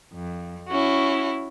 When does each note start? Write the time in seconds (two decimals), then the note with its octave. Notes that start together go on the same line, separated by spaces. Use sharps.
0.13 F2
0.69 C#4 E4 F#4